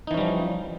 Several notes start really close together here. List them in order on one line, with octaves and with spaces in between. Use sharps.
D#4 E3 C#4 G3 F3